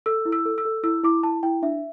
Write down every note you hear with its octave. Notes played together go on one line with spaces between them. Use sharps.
A4 E6
E4
E6
A4
E6
A4
E4 E6
E4 D6
E4 A5
E4 G5
D4 E5